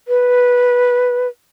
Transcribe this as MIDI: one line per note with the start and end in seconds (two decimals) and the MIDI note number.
0.08 1.27 71